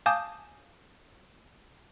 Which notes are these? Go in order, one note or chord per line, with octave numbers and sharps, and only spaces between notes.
F5 G#5 A5 D6 D#6 G6